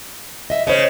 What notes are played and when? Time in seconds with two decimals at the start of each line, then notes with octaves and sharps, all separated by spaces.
0.50 D#5 E5
0.67 C#3 C5 D#5